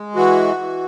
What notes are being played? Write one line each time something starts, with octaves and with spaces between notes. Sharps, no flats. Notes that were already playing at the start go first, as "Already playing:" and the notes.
Already playing: G#3
E3 F#4
E3